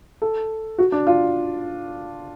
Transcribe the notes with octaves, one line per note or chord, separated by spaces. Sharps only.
A4
F#4
D4
F4